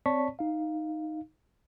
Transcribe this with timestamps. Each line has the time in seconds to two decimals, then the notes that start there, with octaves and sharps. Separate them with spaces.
0.06 C4 C#5 D5 A5 C#6 B6
0.39 D#4 F5